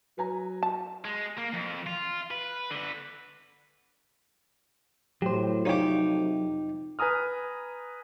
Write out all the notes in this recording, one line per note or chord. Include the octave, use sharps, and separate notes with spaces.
F#3 B4 G#5 A#5
A5
G#3
A#3
F2
F4
B4
D3 B4
A2 F#3 G4 C5
F2 C3 D#4 F4 G4 C#5 D5
B4 G#5 A#5 D#6 F6